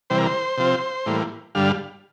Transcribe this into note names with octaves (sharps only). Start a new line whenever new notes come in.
C3 E3 G3 C5
A#4
C5
C3 F3 C4
A2 E3 G3 A#3
G2 D3 G3 F5